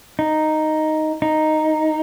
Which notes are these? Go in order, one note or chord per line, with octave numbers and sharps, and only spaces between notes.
D#4
D#4